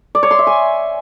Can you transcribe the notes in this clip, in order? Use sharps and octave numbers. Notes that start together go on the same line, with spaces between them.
D5
C#5
C6
E5
G#5